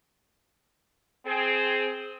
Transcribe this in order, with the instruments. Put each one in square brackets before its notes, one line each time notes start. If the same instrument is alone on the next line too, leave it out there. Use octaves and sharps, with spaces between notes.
[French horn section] C4 G#4